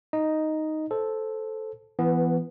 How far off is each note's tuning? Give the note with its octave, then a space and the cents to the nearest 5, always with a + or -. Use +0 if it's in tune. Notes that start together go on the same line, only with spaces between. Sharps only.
D#4 +0 D#5 +0
A4 -5 C5 +0
E3 +25 B3 +0